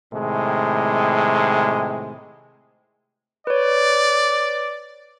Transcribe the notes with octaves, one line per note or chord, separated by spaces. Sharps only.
A2 C3 D#3 G#3
B4 C#5 D5